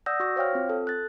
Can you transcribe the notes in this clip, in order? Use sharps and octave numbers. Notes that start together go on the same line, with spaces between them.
D5 F#5 D#6 E6 G6 A#6
F#4 C#6 A#6
C5 C#5 F5 G5 F6
C4 F4
A4
F#6 A6